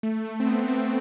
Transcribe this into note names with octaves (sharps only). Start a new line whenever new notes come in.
A3
A3
C4
B3
C4